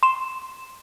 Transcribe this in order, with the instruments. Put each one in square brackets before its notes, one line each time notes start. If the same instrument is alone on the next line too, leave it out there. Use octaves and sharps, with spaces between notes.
[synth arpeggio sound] C6 E7